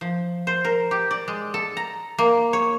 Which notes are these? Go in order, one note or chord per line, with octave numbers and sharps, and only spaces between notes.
F3
C5
A#4
G4
D5
G#3
A4
A#5
A#3
C#5